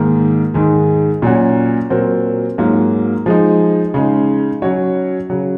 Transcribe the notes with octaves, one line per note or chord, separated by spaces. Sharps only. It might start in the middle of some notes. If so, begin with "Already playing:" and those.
Already playing: G#2 D#3 A#3
G#2 D#3 G#3
A#2 F#3 C#4 F#4
A#2 F#3 C4 F#4 A#4
G#2 F#3 A#3 F4
F3 G#3 D#4
C#3 G#3 D#4
F#3 C#4 F#4 C#5
C#3 F#3